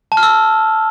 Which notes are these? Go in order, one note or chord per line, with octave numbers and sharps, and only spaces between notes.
A5
F6
E6